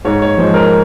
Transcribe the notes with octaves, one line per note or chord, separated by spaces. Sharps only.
G#2 C#5
C#5
F3 G#3 C5
A#4